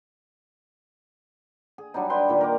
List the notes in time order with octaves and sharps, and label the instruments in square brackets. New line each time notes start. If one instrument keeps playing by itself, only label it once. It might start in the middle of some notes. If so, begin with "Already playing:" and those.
[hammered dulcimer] G#4
F#3 G3 D4 D#4
B4 G5 C6
A#2 D#3 B4
A#4 A#5 D6